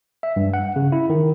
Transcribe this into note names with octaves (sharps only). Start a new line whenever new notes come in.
E5
G2
F#5
C#3
E4
D#3